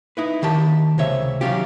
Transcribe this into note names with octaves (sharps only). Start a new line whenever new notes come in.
D#4 E4 B4
D#2 D#3 G4 A5
C#2 C3 C#5 E5
D#3 F#3 G3 C#4 F4 G4